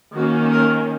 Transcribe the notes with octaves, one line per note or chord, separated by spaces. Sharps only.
D#3 A#3 C#4 F#4
A#4